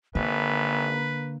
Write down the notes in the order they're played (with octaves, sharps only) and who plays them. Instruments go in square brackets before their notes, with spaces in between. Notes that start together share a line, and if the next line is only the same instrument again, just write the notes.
[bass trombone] G#1 [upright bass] D3 [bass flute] A#3 [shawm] B4